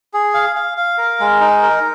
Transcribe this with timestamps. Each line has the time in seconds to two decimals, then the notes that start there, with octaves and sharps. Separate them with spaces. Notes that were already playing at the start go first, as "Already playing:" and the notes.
0.14 G#4
0.34 F5
0.56 F5
0.78 F5
0.98 A#4
1.20 G#3
1.41 D#4
1.62 A#4